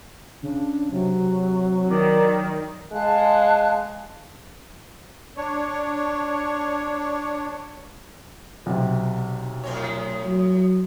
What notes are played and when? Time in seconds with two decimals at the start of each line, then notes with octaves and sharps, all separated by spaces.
0.43 C#3 D4
0.91 C3 F#3
1.90 D#3 D5
2.92 G#3 F5 A5 F#6
5.37 D4 C#5
8.66 B1 C3
9.64 A2 C4 C#5
10.24 F#3